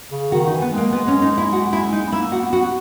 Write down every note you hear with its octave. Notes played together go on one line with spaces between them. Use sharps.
C#3
D#3 F#4
D#4
E3
B3
G#3 A#3
B3
C#4
D#4
E4
F#4
E4
D#4
B3
A#3 E4
F#4
B3
F#4